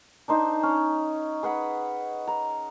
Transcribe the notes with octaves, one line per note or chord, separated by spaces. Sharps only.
D4 D#4 C5 D#5
C#4
G#4 B4 F#5 B5
A#5